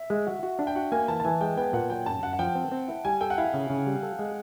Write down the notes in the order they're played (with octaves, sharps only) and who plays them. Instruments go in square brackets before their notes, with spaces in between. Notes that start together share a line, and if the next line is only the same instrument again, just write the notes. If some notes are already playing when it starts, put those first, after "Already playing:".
Already playing: [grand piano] E5
[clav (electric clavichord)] G#3
F#4
F#4
D4
[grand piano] G5
[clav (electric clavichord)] F#4 [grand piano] F#5
[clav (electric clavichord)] A#3 [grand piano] G#5
[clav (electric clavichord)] E3 [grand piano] A5
[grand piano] A5
[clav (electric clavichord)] E3 [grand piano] G#5
[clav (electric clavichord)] G#3 [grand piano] G5
[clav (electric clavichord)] B3 [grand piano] G5
[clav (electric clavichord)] A#2 [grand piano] F#5
[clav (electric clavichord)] F#3 [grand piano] G5
[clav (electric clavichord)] F#2 [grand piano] A5
[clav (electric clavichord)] F#2 [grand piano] F#5
[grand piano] F#5
[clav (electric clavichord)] F3 [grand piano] G5
[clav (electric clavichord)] C4
C4
E4
[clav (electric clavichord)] G3 [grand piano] G#5
[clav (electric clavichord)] A4 [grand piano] G5
[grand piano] F#5
[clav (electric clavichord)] E4 [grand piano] F5
[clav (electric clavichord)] C#3
C#3
G3
A4
G#3